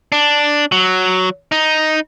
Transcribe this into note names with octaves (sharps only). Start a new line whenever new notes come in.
D4
F#3
D#4